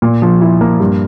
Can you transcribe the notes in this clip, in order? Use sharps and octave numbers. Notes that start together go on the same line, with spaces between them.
A#2
F3
E4
A#3
G2